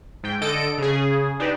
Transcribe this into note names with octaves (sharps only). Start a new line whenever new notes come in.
G#2 G5
D3 A4 D#5 D7
C#3 G#4
D4 D#4 G4 B4